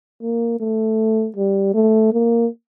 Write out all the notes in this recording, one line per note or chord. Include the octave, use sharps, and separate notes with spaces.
A#3
A3
G3
A3
A#3